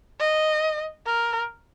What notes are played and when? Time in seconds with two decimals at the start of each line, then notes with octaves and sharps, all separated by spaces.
0.20 D#5
1.06 A#4